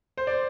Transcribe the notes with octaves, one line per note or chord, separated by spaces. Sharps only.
C5
D5